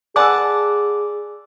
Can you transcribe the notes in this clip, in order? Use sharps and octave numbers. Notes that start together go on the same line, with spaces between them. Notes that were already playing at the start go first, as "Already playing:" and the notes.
G#4 B4 D5 F#5 G#5 A5 D6 E6